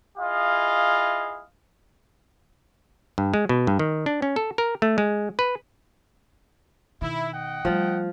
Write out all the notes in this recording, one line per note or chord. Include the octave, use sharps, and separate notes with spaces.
E4 F4 G#4 D#5 F5
G2
G#3
B2
G2
D#3
D4
C#4
A4
A#4
A3
G#3
B4
B2 D#3 E4
D#5 F#5 G5
F3 G3 A3